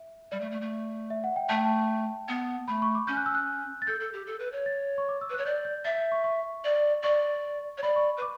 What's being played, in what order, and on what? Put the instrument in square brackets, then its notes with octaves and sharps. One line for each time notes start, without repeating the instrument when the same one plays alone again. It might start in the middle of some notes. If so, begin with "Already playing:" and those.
Already playing: [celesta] E5
[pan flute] G3 [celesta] D5
[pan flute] A3
A3
A3
[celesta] E5
F#5
G5
[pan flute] A3 [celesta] A5
[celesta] G5
A5
[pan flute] B3
[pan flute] A3 [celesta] B5
[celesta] C#6
D6
[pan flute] C#4 [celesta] G6
[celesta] F#6
E6
F#6
A6
[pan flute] A4 [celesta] G6
[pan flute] A4
G4
A4
B4
C#5
[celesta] A6
C#6
D6
E6
[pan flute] B4
[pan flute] C#5 [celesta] F#6
[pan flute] D5 [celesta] G6
[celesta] G6
[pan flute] E5 [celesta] A6
[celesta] G6
C#6
C#6
[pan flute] D5
[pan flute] D5 [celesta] C#6
[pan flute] C#5
[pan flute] D5 [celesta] B5
[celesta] C#6
[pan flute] B4
[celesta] D6